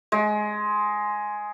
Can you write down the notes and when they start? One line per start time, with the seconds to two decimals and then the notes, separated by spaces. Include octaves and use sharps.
0.12 G#3